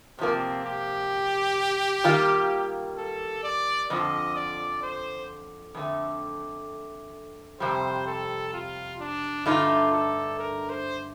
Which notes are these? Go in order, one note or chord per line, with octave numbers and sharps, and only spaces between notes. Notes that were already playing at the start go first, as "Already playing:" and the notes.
C3 F3 A#3 C4
G4
D#3 G3 A#3 F4
A4
D5
F2 D3 F3 D#5
D5
C5
F2 D3 A3
F2 C3 G3 C5
A4
F4
D4
G2 D3 A3 D#4 F4
A4
A#4
C5